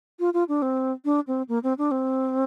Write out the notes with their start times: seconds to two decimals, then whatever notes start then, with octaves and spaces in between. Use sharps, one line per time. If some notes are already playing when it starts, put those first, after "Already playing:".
0.20 F4
0.34 F4
0.48 D4
0.62 C4
1.05 D4
1.27 C4
1.49 A#3
1.63 C4
1.78 D4
1.91 C4